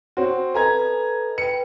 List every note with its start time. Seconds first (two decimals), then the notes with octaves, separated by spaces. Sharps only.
0.17 C4 F#4 C6
0.54 A4 B4 D#5 G#5 A#5 G#6
1.38 B4 G5 C#7